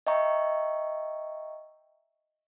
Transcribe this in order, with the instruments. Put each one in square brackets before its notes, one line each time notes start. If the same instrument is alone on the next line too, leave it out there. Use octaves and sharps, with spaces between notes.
[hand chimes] D#5 E5 G5 A#5 C#6